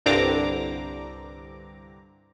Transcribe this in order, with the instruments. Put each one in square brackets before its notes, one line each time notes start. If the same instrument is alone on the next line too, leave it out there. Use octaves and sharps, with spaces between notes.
[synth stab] C2 G2 D3 C4 A#5 D6